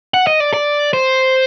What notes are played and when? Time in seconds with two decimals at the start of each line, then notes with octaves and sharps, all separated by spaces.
0.14 F#5
0.27 D#5
0.40 D5
0.54 D5
0.93 C5